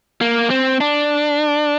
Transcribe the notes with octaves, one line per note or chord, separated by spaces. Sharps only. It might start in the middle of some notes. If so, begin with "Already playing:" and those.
A#3
C4
D4